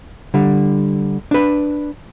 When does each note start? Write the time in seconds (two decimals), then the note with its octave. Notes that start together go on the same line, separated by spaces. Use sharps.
0.34 D3 G3
1.31 D4 B4